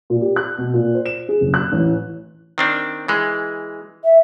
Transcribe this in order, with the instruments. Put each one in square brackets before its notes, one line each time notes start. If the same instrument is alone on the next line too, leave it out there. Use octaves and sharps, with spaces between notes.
[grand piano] A#2
G4
F#6
B2
A#2
C5
E7
G#4
F#1
F#6
A1
[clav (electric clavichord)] D#3 C4 D4
E3 G#3
[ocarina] E5